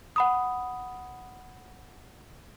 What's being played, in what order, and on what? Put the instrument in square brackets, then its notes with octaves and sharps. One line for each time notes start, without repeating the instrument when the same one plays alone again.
[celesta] F#5 B5 D#6